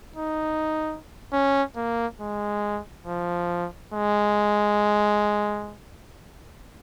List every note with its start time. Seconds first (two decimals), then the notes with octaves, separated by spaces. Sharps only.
0.16 D#4
1.33 C#4
1.76 A#3
2.20 G#3
3.06 F3
3.94 G#3